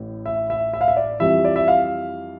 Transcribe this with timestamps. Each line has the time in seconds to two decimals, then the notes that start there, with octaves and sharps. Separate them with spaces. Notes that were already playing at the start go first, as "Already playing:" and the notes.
Already playing: A1 A2
0.26 E5
0.50 E5
0.74 E5
0.81 F5
0.88 E5
0.96 D5
1.20 F2 E3 G3 E5
1.45 D5
1.56 E5
1.68 F5